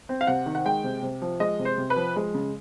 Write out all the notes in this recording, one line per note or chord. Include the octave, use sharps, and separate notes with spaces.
C4
F5
C3 F#5
D#3
F#5
G#3 G5
C3
C3
F3
G#3 D#5
C3
C5
C3
B4
F3
G#3
C#3